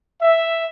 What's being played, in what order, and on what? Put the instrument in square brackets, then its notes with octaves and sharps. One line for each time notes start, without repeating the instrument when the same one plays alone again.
[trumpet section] E5